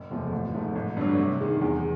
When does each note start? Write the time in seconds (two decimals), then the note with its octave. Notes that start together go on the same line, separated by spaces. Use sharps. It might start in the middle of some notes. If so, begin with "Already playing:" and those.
Already playing: F#1
0.10 E2 C3 F3 A3
0.32 A1
0.54 G#2 F3 A3
0.75 A1
0.97 G2 D3 F#3
1.19 C3
1.41 D#3 G#3
1.61 E2